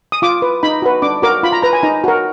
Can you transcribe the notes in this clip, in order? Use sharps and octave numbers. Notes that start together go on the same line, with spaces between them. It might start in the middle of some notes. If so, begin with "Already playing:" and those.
D#6
F4 D6
B4
D#4 B5
F#4 B4
D4 D6
F#4 A#4 D6
F4 B5
A#5
B4 A#5
G#5
D#4 A#5
F#4 A#4